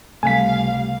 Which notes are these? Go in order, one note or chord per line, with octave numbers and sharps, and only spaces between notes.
C#2 C3 G3 A3 F5 G#5 B6